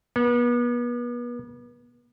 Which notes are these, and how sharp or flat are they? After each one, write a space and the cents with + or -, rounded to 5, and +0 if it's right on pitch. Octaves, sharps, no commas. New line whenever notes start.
B3 -35